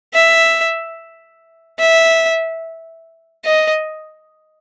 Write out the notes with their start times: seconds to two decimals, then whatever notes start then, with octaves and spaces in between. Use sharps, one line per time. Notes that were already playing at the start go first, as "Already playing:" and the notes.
0.14 E5
1.79 E5
3.45 D#5